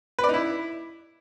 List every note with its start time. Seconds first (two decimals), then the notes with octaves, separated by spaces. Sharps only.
0.19 B4
0.24 D5
0.29 D#4
0.34 E4